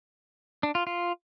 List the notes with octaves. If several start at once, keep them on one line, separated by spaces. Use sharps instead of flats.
D4
F4
F4